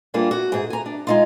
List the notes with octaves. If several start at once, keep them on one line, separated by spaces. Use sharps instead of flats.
G3 A#3 D4 F4 G#4
F#4
G#2 G#4
G#5 A#5
D4
G#3 D#4 F4